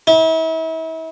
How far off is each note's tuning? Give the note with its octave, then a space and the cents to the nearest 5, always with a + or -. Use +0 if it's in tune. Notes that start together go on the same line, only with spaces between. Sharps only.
E4 -40